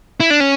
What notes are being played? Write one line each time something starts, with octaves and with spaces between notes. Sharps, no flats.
E4
D4
C#4